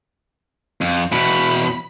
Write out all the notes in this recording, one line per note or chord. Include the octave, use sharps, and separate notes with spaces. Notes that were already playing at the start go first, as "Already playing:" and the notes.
F2
E2 B2 B5